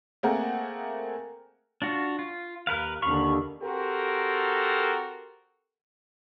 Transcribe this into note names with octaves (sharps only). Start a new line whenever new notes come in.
A3 A#3 C4 G#4 A#4 F#5
D4 F4 F#4
F4
D#2 A#4 B4 F5
D#2 D3 F5 B5 C#6
C4 F#4 G4 A4 A#4